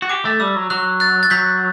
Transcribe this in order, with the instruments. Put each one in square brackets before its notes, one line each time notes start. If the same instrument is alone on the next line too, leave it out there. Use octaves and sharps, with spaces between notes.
[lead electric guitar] F#4
[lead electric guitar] G4 [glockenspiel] D6
[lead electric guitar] A3
[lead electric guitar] G3 [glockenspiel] E6
[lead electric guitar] F#3
[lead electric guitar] F#3 [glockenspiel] F#6
[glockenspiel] F#6 A6
A6
[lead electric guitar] F#3 [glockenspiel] G6 B6